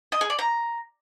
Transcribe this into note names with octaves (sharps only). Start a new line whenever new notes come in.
D#5
G#4
D5
A#5